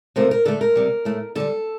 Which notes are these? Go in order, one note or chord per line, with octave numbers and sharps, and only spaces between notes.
C3 F3 A3 A#4
A#4
D3 A3 A4
A#4
C3 G3
A2 A3
D3 G3 A4